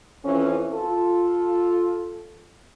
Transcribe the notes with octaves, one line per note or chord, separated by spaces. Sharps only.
F2 E3 C#4
F4 A4